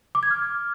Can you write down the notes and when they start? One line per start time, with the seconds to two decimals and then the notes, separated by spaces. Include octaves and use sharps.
0.15 D6
0.23 G#6
0.31 F6